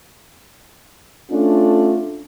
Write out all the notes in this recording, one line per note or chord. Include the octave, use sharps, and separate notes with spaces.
A3 C#4 D4 F4